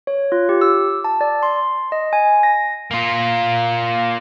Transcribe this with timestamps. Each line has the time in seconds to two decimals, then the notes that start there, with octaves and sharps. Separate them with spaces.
0.07 C#5
0.32 F4
0.49 G4
0.61 E6
1.05 A5
1.21 D5
1.43 C6
1.92 D#5
2.13 G#5
2.43 A#6
2.91 A#3 F4